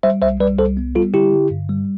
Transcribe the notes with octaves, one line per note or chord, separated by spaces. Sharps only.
G3 C5 E5
C2 C5 E5
G3 B4 D5
C2 A4 C5
B3
G3 F4 A4
D3 E4 G4
D3
G2
G3